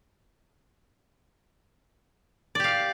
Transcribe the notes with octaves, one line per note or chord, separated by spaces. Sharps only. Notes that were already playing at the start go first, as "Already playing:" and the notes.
G4 D5 F5